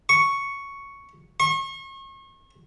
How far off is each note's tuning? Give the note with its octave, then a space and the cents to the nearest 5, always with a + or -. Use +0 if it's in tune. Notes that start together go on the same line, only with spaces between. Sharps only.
C#6 +0
C#6 -40